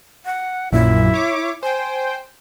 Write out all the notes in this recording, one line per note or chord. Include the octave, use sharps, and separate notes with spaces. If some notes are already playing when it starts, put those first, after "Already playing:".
F#5
A#1 F#2 A#2 E4
C#5 D6
C5 G5 G#5